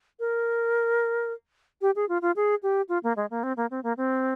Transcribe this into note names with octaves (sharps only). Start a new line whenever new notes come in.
A#4
G4
G#4
F4
F4
G#4
G4
F4
A#3
G#3
A#3
C4
A#3
C4
A#3
C4